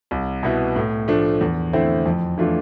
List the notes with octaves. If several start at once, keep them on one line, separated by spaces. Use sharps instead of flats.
C2
B2 B3 E4
A2
F3 A3 D4
E2
D3 A3 C4 E4
F2
E3 A3 D4 F4